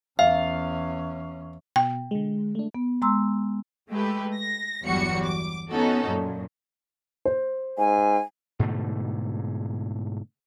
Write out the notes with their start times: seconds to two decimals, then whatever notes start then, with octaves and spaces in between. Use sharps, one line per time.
0.19 E2 C#4 E5 F5
1.76 B2 G5
2.11 D3 G#3
2.55 A3 D4
2.75 B3
3.02 G#3 A#5 C6 E6
3.90 G#3 A3 G4 B4
4.35 A#6
4.84 G1 E2 F#3 G3 F#4 C#7
5.25 D6
5.71 B3 C#4 D#4 F#4 A4
6.07 F#2 A#2
7.25 C5
7.78 G#2 G#5
8.59 G#2 B2 D3 A3